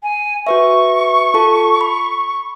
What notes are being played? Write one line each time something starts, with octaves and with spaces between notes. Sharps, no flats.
G#5
F#4 B4 E5 C#6
F4 A4 A5
B5